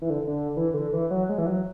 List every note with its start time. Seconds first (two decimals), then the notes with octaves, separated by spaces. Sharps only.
0.02 E3
0.10 D3
0.28 D3
0.57 E3
0.74 D3
0.93 E3
1.11 F#3
1.29 G#3
1.38 E3
1.46 F#3